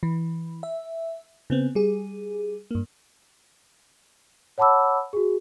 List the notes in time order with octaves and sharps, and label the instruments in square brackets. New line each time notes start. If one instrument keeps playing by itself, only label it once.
[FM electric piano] E3
E5
C#3 B3 C4
G3 G#4
G2 A#3
[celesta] C#5 F#5 A5 B5 D6 E6
F#4 G#4